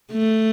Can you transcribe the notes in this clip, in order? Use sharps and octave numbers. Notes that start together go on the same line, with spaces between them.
A3